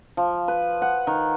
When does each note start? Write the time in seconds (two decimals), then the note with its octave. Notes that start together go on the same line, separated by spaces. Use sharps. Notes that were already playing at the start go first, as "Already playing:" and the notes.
0.17 F3
0.48 B4
0.82 F#5
1.07 D#3